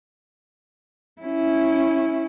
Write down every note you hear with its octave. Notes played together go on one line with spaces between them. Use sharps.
C#4 E4